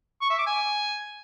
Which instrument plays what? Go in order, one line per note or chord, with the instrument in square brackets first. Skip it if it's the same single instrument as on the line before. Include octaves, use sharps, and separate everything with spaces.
[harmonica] C#6
E5
D6
G#5